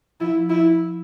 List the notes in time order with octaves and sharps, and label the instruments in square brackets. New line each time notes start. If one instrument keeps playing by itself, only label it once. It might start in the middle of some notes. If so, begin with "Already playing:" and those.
[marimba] F3 [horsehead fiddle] E4
[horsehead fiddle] E4